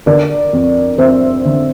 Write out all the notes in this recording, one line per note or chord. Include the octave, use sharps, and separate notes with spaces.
D3 A#4 D5
F2
F2 C5 E5
D3